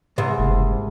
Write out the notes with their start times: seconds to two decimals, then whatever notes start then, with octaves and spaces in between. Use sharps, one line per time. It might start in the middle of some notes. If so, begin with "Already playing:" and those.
0.18 C2 G#2
0.39 F#1